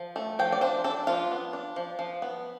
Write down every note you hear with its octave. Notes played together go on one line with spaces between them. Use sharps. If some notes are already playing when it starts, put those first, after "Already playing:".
Already playing: F3
A3
F3 G5
D5
D4 C5
D4 A4
F3 F4
B3
D4
F3
F3
B3